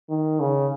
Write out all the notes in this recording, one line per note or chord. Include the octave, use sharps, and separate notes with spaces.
D#3
C#3